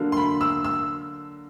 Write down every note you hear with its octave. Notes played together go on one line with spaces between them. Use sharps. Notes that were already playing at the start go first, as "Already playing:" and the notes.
Already playing: D3 F#3 A#3 D4
C6
B5
E6
E6